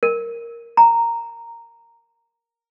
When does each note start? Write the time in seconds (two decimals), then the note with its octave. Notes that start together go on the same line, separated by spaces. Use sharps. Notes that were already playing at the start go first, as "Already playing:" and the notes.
0.03 A#4
0.77 A#5